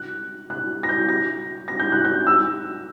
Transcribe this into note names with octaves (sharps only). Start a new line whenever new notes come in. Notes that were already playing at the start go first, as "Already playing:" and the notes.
Already playing: F#6
F#6
A#6
G6
A#6
A#6
G6
F#6
G6
E6